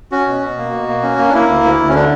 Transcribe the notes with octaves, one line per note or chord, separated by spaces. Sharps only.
C#4 F#4
B2
B2
A#3
B2
A#3
C#4
A#3
D4
A#3 E4
D2
D2
D2
C#4
D3 D4